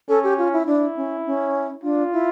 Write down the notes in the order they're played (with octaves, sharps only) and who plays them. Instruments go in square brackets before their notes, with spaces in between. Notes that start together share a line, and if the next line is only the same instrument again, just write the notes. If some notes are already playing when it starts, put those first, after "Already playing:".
[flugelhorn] C#4 [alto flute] A4
[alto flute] G4
F4
E4
[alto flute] D4 [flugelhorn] E4
[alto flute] C#4
C#4
[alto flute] D4 [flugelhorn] F4
[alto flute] E4